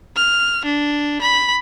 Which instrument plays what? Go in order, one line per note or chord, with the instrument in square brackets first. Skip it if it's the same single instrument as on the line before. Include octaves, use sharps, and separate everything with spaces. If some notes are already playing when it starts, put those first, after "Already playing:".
[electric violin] F6
D4
B5